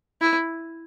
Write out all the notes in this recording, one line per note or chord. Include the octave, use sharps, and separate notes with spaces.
E4